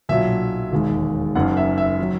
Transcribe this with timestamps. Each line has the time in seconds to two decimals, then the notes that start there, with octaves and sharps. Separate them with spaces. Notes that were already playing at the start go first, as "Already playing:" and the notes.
0.09 B1 A#2 F#3 E5
0.72 E1 D#2 D#3 G#3
1.35 F#1 F#2 D#3 F#5
1.57 E5
1.78 E5
2.00 D#3 F#3